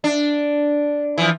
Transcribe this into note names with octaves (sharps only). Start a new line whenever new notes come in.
D4
E3 F3